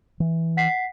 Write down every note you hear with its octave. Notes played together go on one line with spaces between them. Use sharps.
E3
F#5 B6 C7